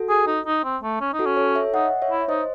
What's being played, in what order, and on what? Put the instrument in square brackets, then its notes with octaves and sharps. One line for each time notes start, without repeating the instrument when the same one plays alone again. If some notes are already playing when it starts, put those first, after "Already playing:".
Already playing: [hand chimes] F#4 A4
[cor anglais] G#4
D#4
D#4
C4
A3
C#4
D#4
[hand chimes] F#4 A4
[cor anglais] C#4
[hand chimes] A4 C#5
C#5 E5
[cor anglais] D#4 [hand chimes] D#5 F#5
[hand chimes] C#5 E5
[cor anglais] E4
[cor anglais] D#4 [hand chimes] C5 D#5